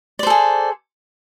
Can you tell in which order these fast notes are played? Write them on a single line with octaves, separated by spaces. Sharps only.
D5 C5 A4 G#4